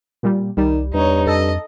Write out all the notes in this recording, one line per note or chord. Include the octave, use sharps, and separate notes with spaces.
A#2 G3
C2 D#3 G3
E2 G2 D#4 C#5
F2 A4 D#5